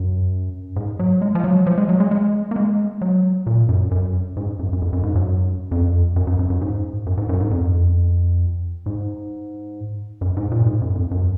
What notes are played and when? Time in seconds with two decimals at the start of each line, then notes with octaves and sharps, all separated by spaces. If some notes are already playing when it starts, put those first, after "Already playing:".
Already playing: F#2
0.76 G#2
0.99 F#3
1.22 G#3
1.35 F3
1.44 F#3
1.67 F3
1.78 G#3
1.89 F#3
2.00 G#3
2.11 G#3
2.51 A#3
2.56 G#3
3.01 F#3
3.46 A#2
3.69 F#2
3.91 F#2
4.37 G#2
4.59 F#2
4.73 F#2
4.82 F2
4.93 F#2
5.03 G#2
5.15 F#2
5.71 F2
6.16 F#2
6.27 F#2
6.39 F#2
6.50 F#2
6.61 G#2
7.06 F#2
7.17 G#2
7.29 F#2
7.40 G#2
7.51 F2
8.86 G#2
10.21 F#2
10.37 G#2
10.52 A#2
10.66 G#2
10.82 F#2
10.96 F2
11.11 F#2